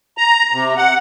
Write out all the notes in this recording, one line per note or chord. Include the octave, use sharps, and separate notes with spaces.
A#5
C3
F#5